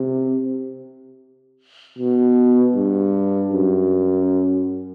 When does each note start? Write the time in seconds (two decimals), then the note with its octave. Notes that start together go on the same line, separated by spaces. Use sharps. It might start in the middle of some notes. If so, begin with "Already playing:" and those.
Already playing: C3
1.98 B2
2.75 G2
3.52 F#2